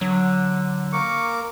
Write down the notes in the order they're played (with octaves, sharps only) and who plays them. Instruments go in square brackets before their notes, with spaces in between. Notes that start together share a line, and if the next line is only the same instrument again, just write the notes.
[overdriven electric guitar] D3 [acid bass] F#3
[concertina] A#3 A#4 D6 [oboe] C#6